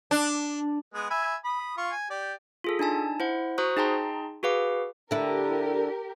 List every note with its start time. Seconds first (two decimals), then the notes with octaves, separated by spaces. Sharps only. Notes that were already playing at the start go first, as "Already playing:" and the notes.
0.11 D4
0.94 G#3 B3 G#4
1.10 E5 G#5 B5
1.45 B5 D#6
1.78 F4 C#6
1.91 G#5
2.10 G4 D5
2.64 F4 G#4 A4
2.79 D4 D#4 G#5 A5
3.20 E4 C5 F#5
3.58 F#4 C5 A#5 C#6 D#6 F#6
3.77 D#4 G#4 G5 A5 A#5 C6
4.43 F#4 G#4 B4 F5 D6
5.11 D3 E4 G4 A#4